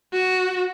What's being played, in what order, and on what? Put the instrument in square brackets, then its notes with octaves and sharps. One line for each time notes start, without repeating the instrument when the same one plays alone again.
[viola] F#4